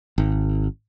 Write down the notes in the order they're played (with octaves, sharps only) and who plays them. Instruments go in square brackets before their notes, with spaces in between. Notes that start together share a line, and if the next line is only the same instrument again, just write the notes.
[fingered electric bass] G#1